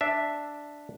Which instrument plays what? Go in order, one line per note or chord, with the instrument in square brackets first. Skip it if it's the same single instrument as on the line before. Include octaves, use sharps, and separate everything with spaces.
[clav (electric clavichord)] D4 E5